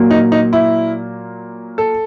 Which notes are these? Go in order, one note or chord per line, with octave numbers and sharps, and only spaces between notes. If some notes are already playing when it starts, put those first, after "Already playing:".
Already playing: A#2 F#3 A#3
D#4
D#4
E4
A4